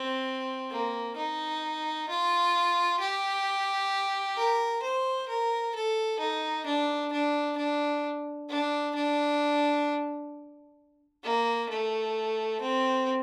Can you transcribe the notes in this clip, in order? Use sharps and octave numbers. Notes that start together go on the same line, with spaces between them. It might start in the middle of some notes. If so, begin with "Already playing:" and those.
Already playing: C4
A#3
D#4
F4
G4
A#4
C5
A#4
A4
D#4
D4
D4
D4
D4
D4
A#3
A3
C4